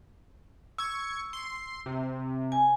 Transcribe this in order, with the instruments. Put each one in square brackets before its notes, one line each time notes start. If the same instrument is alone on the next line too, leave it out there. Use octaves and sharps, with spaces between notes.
[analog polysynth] C#6 G#6 [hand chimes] E6
[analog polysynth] C6
C3
[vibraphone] G#5